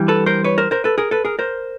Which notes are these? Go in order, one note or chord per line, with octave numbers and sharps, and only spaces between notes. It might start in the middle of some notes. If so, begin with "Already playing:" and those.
Already playing: G2 E3 G3
A4 B4
A#4 C5
B4 C#5
A#4 C5
A#4 C5
A4 B4
G#4 A#4
A4 B4
G#4 A#4
A#4 C5